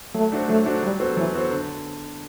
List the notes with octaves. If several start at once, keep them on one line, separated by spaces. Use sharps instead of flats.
F#3 A3
A3 D4 F#4 C5
F#3 A3
A3 D4 F#4 C5
F#3 G3
B3 F#4 A4 C5
E3 F#3
B3 F#4 A4 C5
D3